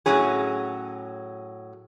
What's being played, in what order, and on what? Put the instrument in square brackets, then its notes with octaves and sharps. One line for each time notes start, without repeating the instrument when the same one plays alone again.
[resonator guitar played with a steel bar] A2 F#3 C#4 G#4